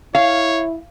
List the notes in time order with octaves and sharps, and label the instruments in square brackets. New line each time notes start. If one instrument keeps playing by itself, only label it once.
[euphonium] E4 [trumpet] C#5 [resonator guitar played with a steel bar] F5